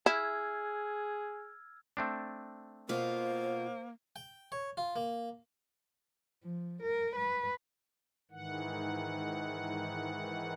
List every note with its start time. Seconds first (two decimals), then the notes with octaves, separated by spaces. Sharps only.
0.06 E4 G#4 E6 F6 G#6
1.97 A3 C4 D4
2.89 B2 A#3 F4 C5
4.16 G5
4.52 C#5
4.77 F4
4.96 A#3
6.44 F3
6.83 A#4
7.16 B4
8.31 G#2 D#3 E3 F#5